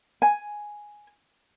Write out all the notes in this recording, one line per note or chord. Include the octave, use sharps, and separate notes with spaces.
G#5